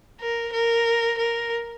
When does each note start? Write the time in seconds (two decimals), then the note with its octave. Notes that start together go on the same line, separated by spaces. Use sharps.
0.21 A#4
0.53 A#4
1.18 A#4